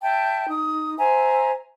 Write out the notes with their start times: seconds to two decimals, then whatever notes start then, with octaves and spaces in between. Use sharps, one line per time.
0.02 E5 G5 A5
0.49 D#4 D#6
0.98 C5 E5 G#5 A#5